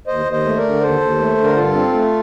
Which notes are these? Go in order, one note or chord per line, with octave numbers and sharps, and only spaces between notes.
D#2 C5 D#5
D#2
C5 D#5
A3
A#4 D5
D3
D#2 A4 C5
D#2
A3
D3
A#4
G2 F4 A4
C4
A3